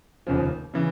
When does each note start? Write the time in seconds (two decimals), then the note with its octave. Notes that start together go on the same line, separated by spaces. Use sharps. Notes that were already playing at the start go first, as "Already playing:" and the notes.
0.27 F1 D#2 C#3 F3
0.74 C#3 E3